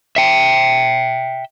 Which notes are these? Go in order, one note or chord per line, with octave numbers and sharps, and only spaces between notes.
E5 G5